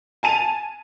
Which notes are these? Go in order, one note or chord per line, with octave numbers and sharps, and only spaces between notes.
G#5 A5 D#7 F7